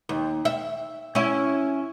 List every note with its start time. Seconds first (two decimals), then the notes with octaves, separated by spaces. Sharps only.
0.09 D#2
0.45 E5
1.15 C#4 E4